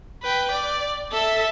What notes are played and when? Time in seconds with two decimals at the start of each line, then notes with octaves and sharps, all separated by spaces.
0.23 B4 G5
0.52 D5
1.12 A4 E5